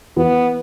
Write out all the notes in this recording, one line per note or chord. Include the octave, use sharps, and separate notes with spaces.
E3 B3